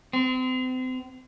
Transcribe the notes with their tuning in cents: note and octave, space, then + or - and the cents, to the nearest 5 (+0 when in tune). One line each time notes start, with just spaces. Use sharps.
C4 -35